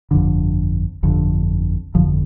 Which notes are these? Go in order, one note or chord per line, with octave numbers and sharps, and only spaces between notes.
G1 F2 D3
G1 F2 D3
G1 F2 D3 F3